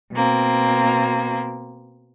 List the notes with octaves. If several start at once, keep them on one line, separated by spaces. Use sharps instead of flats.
B2 A#3 C4